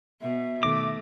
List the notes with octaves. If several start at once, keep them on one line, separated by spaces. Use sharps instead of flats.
B2 E5
B2 D#3 A3 D6 A#6